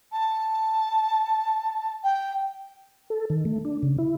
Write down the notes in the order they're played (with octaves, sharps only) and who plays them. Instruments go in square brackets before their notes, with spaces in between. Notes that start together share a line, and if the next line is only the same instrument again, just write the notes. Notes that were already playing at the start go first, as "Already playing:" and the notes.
[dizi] A5
G5
[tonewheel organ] A4
D#3
A3
D4
C#3
E4